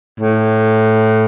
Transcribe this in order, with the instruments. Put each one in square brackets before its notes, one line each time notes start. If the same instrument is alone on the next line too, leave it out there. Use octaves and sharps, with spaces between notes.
[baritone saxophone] A2